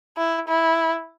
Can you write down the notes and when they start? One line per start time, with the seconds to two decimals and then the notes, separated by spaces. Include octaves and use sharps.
0.17 E4
0.48 E4